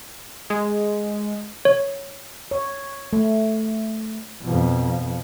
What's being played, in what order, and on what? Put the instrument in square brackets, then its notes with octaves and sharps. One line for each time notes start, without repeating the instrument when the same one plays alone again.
[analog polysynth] G#3
[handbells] C#5
[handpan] C#5
A3
[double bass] F2 B2